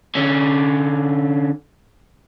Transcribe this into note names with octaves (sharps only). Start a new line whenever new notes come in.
D3 C#4